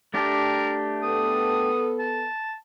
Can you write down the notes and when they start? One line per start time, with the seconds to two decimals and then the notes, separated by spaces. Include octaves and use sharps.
0.14 A3 D4 G4 A#4
1.03 B3 A4 D#6
1.99 A5